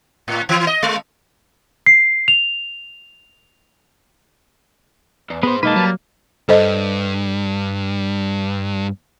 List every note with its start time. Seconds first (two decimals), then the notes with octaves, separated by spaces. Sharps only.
0.28 A2
0.49 E3
0.67 D#5
0.83 G#3
1.86 C7
2.28 F7
5.30 E2
5.43 G#3 B3 C5
5.63 B1 G#3 A#3 D#4 B4 D#5 A5
5.76 F#3 G3
6.49 G2 A4 C5 D#5